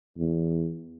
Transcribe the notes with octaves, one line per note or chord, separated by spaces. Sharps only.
E2